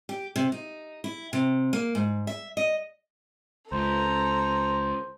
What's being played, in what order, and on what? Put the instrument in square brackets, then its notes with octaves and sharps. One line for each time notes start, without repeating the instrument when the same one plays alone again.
[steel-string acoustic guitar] G4
C3
D#4
E4
C3
A#3
G#2
E5
D#5
[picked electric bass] C#2 [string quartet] A4 A#5 [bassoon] C5